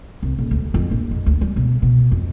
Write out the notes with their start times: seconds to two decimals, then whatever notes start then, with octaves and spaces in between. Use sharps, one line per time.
0.23 C2
0.38 D#1
0.51 D2
0.74 F2
0.91 A#1
1.11 F2
1.26 D2
1.41 G3
1.56 B2
1.82 B2
2.12 F2